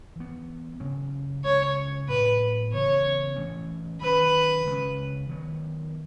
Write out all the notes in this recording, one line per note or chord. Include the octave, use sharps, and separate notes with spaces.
E3 B3
C#3 F#3 C#4
C#3 G#3 C#4 C#5
A2 F#3 B3 B4
C#3 E3 B3 C#5
E3 A3 C#4
D#3 F#3 C#4 B4
C#3 G#3 C#4
D#3 F#3 B3